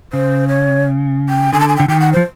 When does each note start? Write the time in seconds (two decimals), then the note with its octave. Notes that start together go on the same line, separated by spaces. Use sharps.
0.13 C#3 C5
0.48 C#5
1.29 G5
1.53 D3 G#5
1.60 A5
1.68 G#5
1.77 D3 G5
1.88 D#3 G5
2.00 F#5
2.13 F3 C5